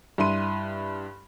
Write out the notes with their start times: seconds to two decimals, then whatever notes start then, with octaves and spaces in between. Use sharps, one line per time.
0.18 G2 E4 C6 D#7